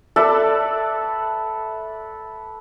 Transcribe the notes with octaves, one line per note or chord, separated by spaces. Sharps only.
A4 B4 D5 E5